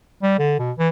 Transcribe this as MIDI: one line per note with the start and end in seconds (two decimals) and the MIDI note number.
0.23 0.37 55
0.39 0.56 50
0.59 0.71 47
0.78 0.88 52